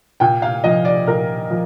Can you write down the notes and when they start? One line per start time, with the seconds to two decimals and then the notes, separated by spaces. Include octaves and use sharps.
0.20 A#2 G5
0.42 F5
0.64 F3 D#5
0.85 D5
1.07 A#2 A#4
1.50 F3